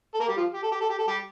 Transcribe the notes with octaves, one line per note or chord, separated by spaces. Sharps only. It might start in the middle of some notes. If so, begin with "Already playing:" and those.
A4
A#3 A#4
G3 G4
F3 F4
G4
A4
G4
A4
G4
A4
G3 G4